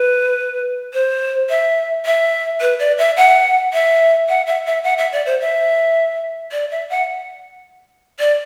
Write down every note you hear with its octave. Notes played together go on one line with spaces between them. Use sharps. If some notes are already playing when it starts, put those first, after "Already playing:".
Already playing: B4
C5
E5
E5
B4
D5
E5
F#5
E5
F#5
E5
E5
F#5
E5
D5
C5
E5
D5
E5
F#5
D5